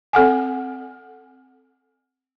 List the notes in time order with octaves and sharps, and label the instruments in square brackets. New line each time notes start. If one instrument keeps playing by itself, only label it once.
[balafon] C4 A4 F#5 G#5